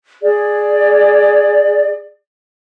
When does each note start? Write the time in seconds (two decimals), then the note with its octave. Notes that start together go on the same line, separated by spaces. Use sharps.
0.21 G#4 D5